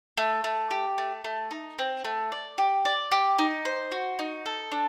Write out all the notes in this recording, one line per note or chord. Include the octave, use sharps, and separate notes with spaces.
A3
A3
G4
A3
A3
D#4
C4
A3
D5
G4
D5
G4
D#4
C5
F#4
D#4
A4
D4